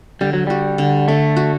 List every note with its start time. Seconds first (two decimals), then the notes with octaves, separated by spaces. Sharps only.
0.21 D3 G3
0.33 F#3
0.47 G3 F#4
0.78 D3
1.08 D3 A3
1.36 F#4